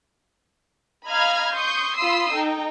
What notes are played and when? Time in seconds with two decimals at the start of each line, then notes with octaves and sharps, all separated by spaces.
1.09 D#5 F5 A#5 B5 F6 G#6
1.56 C6 C#6 D#6 G6
1.97 F4 B5 C6 D#6 E6 C7
2.33 D#4 A4 G5